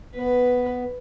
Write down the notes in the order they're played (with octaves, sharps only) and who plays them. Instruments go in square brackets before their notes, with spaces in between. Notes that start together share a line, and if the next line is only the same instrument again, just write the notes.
[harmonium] B3 [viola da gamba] B4